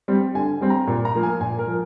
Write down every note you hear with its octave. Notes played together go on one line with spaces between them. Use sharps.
G3 C4
D3 G#5
G3 C4
A#5
A#2
A#5
F3 A#3
G#5
A#2 G#5
A#4
F3